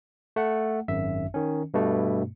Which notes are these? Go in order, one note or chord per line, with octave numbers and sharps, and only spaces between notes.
A3 F#5
G#1 F#2 E5
D#3 C#4
G2 B2 A3 B3